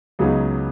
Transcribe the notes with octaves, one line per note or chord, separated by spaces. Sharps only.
C#2 C#3 F#3 B3 D#4